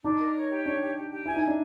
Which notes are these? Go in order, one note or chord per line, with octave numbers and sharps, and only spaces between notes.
D4 D#4
A#4
C#5
G4
D4 C#5
G4
G4
G4
E4 G#5
D#4
G#5
D4